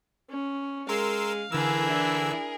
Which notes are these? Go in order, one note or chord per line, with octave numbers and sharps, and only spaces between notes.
C#4
G#3 A#4 F5 C6 E6
D3 E3 G#4 A#4 E6
D4 E4